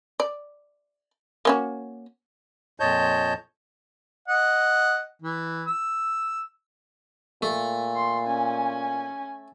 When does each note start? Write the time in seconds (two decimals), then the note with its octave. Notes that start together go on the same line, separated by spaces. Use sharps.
0.20 D5
1.45 A#3 C#4 F#4
2.80 F2 A#2 C#5 D#5 A5 G6
4.28 D#5 F#5
5.22 E3
5.67 E6
7.42 A#2 A3
7.96 C6
8.27 C#4 G#5